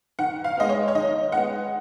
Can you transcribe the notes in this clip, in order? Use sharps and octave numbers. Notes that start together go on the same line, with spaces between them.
D#3 F#5
F5
G#3 B3 D#5
C#5
C#5
D#3 D#5
G#3 B3 F#5